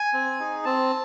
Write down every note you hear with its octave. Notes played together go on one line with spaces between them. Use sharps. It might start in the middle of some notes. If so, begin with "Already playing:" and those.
Already playing: G#5
C4
D#4 G#4
C4 A5